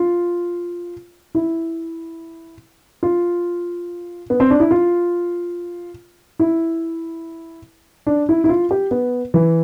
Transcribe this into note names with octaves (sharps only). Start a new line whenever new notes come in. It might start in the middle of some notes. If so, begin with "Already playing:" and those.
Already playing: F4
E4
F4
B3
C4
D4
E4
F4
E4
D4
E4
E4
F4
G4
B3
E3